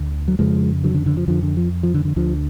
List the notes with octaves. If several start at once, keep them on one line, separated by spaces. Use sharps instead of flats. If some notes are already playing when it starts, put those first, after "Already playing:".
Already playing: D2 D3
F#3
F2 C#3 F3 G#3
D3 F#3
D3
D3
F3
F2 D3 F3
D3
F3
F3
D3
D3
D2 D3 F3